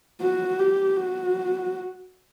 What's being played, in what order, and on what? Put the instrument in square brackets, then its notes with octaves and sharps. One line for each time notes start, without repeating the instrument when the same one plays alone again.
[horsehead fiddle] F#4
G4
F#4